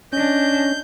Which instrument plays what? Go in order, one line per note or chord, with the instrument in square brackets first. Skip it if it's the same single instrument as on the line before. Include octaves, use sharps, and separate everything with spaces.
[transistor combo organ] C#4 [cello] D4 D#5 [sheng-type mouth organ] G6